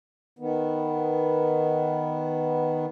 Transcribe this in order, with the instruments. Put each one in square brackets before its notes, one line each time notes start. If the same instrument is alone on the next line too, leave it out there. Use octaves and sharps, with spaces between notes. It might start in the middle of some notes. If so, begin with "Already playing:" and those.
[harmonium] D#3 B3